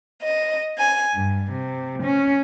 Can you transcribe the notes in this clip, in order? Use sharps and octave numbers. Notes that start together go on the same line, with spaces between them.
D#5
G#5
G2
C3
C#4